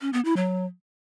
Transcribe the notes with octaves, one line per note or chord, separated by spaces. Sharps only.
C#4
B3
E4
F#3